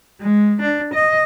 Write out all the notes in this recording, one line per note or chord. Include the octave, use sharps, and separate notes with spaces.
G#3
D4
D#5